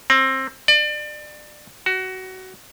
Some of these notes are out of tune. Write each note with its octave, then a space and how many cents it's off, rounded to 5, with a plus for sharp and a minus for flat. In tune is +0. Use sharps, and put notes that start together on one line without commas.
C4 +20
D5 +30
F#4 +20